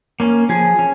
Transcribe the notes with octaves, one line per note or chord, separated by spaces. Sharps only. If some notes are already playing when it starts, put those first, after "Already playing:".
A#3 C#4
F3 G#4
C#4